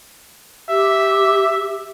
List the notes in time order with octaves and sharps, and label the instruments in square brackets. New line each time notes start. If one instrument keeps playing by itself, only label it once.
[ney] G4 [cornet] E5